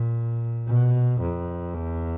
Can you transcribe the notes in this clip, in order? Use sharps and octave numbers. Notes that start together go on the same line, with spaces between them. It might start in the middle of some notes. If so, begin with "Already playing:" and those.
Already playing: A#2
B2
F2
E2